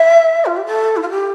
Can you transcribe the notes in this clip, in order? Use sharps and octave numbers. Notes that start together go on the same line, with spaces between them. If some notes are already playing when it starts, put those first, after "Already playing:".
Already playing: E5
F4
G4
A4
E4
F4
G4